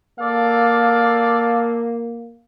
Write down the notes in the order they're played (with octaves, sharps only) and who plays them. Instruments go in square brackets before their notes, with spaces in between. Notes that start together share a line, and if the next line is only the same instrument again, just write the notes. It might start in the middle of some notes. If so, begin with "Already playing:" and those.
[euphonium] A#3 [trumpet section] A4 D5 F5